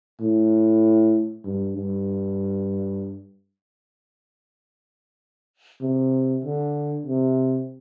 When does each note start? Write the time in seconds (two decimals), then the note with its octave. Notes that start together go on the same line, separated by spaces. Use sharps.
0.21 A2
1.45 G2
1.77 G2
5.81 C3
6.44 D3
7.06 C3